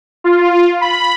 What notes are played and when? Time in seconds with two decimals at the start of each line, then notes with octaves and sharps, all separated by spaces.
0.24 F4
0.81 B5